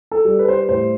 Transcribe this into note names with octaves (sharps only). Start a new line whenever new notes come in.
A4
G3
B4
C5
B4
A2 C5